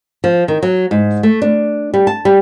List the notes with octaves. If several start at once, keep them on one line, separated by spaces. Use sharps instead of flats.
F3
D#3
F#3
G#2
A3
D4
G3
A5
G3